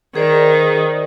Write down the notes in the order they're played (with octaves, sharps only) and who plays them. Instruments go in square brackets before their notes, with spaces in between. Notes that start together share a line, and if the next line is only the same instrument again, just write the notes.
[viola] D#3 [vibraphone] G#4 C5 D5